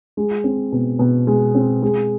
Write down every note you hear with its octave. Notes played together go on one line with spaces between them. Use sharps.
G#3
C4
B2
B2
G#3
C4
G#3